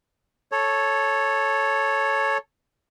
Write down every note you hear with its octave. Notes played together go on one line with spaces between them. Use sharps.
A4 C#5